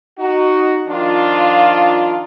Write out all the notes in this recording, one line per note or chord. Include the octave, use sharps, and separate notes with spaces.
D#4 F#4
D#3 F3 D4 F4